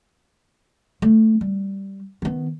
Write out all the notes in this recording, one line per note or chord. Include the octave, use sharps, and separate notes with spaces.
A3
G3
D#3 B3